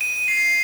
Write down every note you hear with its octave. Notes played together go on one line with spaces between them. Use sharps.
D#7
C7